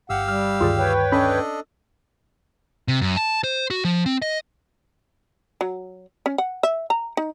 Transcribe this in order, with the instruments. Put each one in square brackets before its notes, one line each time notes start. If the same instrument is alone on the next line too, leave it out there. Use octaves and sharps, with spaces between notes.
[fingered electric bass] G1 [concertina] G4 F5 E6 [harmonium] F#5
[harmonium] G3 [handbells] F6
[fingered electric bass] D2 G2 D#3 [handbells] F4 G#4 D5
[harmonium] B4 C#5 G5
[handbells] C#4 B5 B6 [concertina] D4 A4 D#5
[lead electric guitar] C3
F#2
A5
C5
F#4
F3
C4
D#5
[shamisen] F#3
C#4
F#5
E5
A#5
D#4